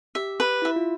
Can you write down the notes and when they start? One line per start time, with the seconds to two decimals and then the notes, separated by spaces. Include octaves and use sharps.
0.15 G4 E5
0.40 B4
0.62 E4 E5
0.76 F4